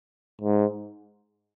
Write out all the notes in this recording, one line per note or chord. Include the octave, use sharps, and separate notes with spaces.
G#2